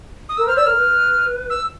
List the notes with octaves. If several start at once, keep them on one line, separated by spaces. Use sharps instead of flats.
D#6
A#4 E6
C5 F6
D5 E6
A#4 F6
B4
E6